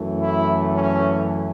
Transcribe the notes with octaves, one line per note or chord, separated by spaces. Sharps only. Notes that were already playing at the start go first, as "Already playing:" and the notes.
Already playing: F#2 E3 A3
E4
C#4